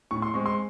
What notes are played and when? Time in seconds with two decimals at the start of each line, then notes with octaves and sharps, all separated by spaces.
0.11 A2 C#6
0.22 C6
0.34 G#3 C4 C#6
0.46 C6